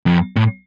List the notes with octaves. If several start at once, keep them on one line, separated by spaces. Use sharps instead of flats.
F2
A2